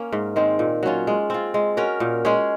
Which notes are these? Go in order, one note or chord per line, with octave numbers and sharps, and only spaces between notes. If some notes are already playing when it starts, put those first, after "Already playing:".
Already playing: A#3 C#4
G#2
D#3 G#3 C4
A#2
F#3 C#4 F4
G#3
C4 F4
G#3
C#4 F#4 A#4
A#2
G#3 C#4 G#4